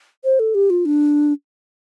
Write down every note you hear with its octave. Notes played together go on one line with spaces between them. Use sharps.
C5
A4
G4
F4
D4